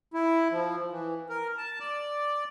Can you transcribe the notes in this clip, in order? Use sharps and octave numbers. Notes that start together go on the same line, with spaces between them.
E4
F3
E3
A#4
A5
D5